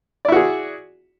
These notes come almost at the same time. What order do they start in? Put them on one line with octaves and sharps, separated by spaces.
D5 E4 F#4 G#4